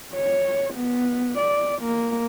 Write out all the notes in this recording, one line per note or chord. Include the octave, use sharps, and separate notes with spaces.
C#5
B3
D5
A#3